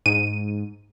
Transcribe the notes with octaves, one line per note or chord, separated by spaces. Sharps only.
G#2 D#7